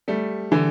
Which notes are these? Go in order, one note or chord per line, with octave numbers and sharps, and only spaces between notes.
G3 A3
D3 E3